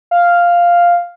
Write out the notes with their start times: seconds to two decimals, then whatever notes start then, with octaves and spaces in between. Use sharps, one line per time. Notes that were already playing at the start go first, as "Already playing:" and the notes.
0.11 F5